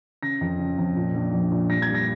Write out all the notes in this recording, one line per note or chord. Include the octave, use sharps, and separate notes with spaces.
C#3 A#6
F2
C#3
F2
A#2
A#1
A#1
A#2
G2 A#6
G#6
G3
A#6